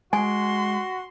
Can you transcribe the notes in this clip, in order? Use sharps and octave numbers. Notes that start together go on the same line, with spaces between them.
G#3 F#4 G#5 C6